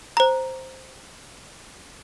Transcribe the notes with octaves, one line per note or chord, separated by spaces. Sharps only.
C5 A#5